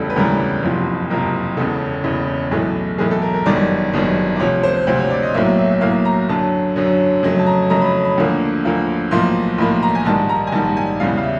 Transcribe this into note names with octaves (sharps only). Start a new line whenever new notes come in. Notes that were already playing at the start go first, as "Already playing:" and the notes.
Already playing: E1 D2 C#3 E3 G3 A4
B4
E1 D2 C#3 E3 G3 A#4
F#1 F2 C3 F3
F#1 F2 C3 F3 A#4
E1 E2 C#3 A4
E1 E2 C#3
B1 A2 E3 A3 G#4
B1 A2 E3 A3 G#4
A4
A#4
A#4
G1 F#2 D#3 G3 D5
G1 F#2 D#3 G3
D5
D2 C3 F3 C#5
C5
D2 C3 F3 C5
C#5
D5
D#5
B1 A2 F#3 A#3 E5
E5
E5
B1 A2 F#3 A#3 F5
A#5
F#2 D3 F#3 A5
F#2 D3 F#3
F2 C#3 F#3 A3
A5
A#5
F2 C#3 F#3 A3 A#5
B5
B5
D2 D3 F3 A#3
D2 D3 F3 A#3
B1 A2 F3 A#3 C6
B1 A2 F3 A#3 B5
A#5
G#5
A#1 G#2 D#3 G3 A5
A#5
G#5
A#1 G#2 D#3 G3 A5
G#5
E2 C#3 E3 G3 F5
F5
E5